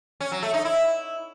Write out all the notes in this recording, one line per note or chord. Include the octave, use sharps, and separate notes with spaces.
C#4
F#3
A3
D#4
E4